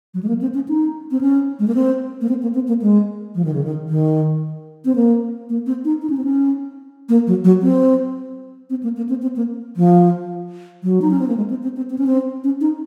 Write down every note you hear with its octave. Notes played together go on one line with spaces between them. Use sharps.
F#3
G#3
A#3
C4
C#4
D#4
C4
C#4
G#3
A#3
C4
A#3
C4
A#3
C4
A#3
G#3
F3
D#3
C#3
D#3
D#3
C4
A#3
A#3
C4
D#4
D#4
C#4
C4
C#4
A#3
F#3
F#3
C4
C4
A#3
A#3
C4
C4
A#3
F3
F#3
D#4
C#4
C4
A#3
G#3
C4
C4
C4
C4
C#4
C4
C#4
D#4